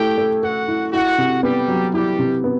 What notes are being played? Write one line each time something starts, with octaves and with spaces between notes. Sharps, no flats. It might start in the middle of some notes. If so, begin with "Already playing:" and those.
Already playing: A3 E4 G4 G5
A3
F#4 A4 F#5
E4
E4 F#4 F#5
C3
G3 B3 G4
F#3
G3 E4 G4
C3
B3